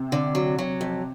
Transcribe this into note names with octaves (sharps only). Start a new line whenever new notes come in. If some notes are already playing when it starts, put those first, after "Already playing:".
Already playing: C3
D3
F#3
F#3
F2